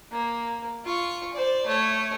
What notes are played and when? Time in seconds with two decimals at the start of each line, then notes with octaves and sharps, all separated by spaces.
0.11 A#3
0.85 F4 C#6
1.33 C5 D5
1.66 A3 C#5